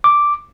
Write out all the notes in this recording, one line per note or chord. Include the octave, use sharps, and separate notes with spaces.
D6